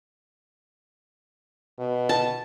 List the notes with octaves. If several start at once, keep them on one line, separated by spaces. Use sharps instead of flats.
B2
A5